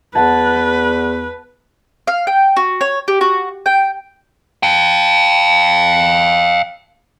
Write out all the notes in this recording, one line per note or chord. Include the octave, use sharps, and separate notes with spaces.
E2 B4 F#5 A5 G#6
F5
G5
F#4
C#5
G4
F#4
G5
F5 G5